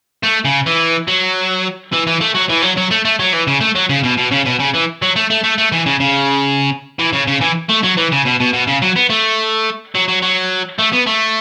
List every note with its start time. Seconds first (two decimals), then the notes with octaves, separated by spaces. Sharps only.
0.23 A3
0.45 C#3
0.66 E3
1.08 F#3
1.93 E3
2.07 E3
2.21 A3
2.35 F#3
2.49 E3
2.62 F#3
2.77 F#3
2.91 A3
3.05 A3
3.20 F#3
3.33 E3
3.47 C#3
3.61 A3
3.75 F#3
3.90 C#3
4.04 B2
4.18 B2
4.32 C#3
4.46 B2
4.60 C#3
4.74 E3
5.02 F#3
5.16 A3
5.30 A3
5.44 A3
5.58 A3
5.72 E3
5.86 C#3
6.00 C#3
6.99 E3
7.13 C#3
7.27 C#3
7.41 E3
7.69 A3
7.83 F#3
7.97 E3
8.12 C#3
8.25 B2
8.40 B2
8.53 B2
8.67 C#3
8.82 F#3
8.96 B3
9.10 A3
9.95 F#3
10.08 F#3
10.22 F#3
10.79 A3
10.93 B3
11.07 A3